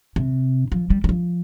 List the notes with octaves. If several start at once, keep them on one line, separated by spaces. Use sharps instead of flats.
C3
F3
G3
G3
F3